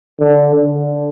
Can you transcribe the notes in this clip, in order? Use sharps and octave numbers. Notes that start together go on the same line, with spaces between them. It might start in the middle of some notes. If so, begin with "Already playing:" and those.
D3
D3